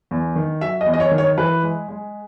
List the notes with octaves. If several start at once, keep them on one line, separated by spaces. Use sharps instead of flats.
E2
D#3
F#3 E5
D#5
E2
D#5
C#5
D#3
C#5
E3 B4
G#3
G#3